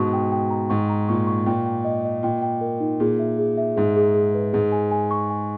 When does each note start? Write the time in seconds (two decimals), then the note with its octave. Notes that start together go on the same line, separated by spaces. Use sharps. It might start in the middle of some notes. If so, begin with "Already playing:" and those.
Already playing: G#2 B2 C#6
0.13 G5
0.32 G5
0.50 A#5
0.70 G#2 C#6
0.89 A#5
1.09 A#2 C#6
1.27 C#6
1.46 A#2 G5
1.66 G5
1.85 D#5
2.05 D#5
2.23 A#2 G5
2.42 G5
2.61 A#4
2.80 D#4
3.00 A#2 G#4
3.19 E5
3.39 G#4
3.58 E5
3.76 G#2 G#4
3.96 G#4
4.14 G#4
4.34 B4
4.53 G#2 G#4
4.72 G#5
4.91 G#5
5.11 C#6
5.30 G#5